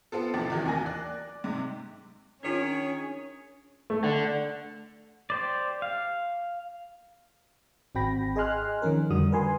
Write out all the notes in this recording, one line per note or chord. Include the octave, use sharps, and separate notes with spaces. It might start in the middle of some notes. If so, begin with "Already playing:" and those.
B3 C4 F4 A4
A1 F2 C3 D4 E4 A6
E2 C3 D#3 E3 F#3
A1 D#2 A#4 G#5 A#6
D5 F#6
G#2 C3
D#3 C#4 D4 F4 G#4 C#5
A3
D3
G4 C5 D5
F5
G#1 C4 F#4 G5 B5 A#6
G#4 D#5 G#5 C6 F6 F#6
D#3 F3 C#4 A#4
F2 D3 G3 F#4 D#6
A#4 B4 G#5 C6